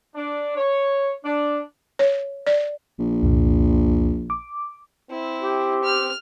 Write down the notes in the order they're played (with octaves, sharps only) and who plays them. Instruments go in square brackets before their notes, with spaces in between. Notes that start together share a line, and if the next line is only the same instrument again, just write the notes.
[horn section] D4
C#5
D4
[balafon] C#5
D5
[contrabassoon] A#1
[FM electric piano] C2 F2 A#2
D6
[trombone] C4 [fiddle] E4
[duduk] G4
[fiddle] F6